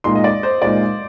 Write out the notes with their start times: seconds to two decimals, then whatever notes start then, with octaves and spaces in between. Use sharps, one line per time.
0.04 A#2 G#3 D#4 C6
0.15 D#5
0.24 D5
0.43 C5
0.62 A#2 G#3 D#4 D5
0.82 D#5